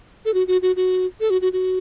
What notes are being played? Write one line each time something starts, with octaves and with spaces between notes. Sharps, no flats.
A4
F#4
F#4
F#4
F#4
A4
F#4
F#4
F#4